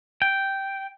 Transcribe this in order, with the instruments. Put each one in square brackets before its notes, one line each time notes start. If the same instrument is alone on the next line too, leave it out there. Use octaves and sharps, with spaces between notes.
[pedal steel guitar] G5